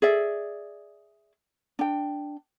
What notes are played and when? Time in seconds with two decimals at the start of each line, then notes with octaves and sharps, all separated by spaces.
0.02 G#4 D5 E5
1.79 D4 G5